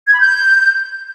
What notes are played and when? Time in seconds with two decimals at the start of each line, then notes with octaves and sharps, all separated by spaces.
0.07 G#6
0.13 B5
0.19 G6